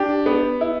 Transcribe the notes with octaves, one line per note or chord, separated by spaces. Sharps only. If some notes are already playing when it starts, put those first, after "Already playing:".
Already playing: D4 G4
B3
E4